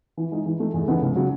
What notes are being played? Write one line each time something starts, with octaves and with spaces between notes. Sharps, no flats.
E3
G#3 D#4
E3
A3 D#4
E2
C#3 E3 B3 D#4
C#2
C#3 F#3